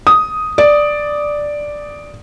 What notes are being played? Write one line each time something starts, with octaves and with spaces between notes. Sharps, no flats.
D#6
D5